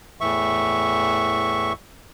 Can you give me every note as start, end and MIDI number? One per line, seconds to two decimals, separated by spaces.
0.21 1.73 40
0.21 1.73 45
0.21 1.73 52
0.21 1.73 76
0.21 1.73 85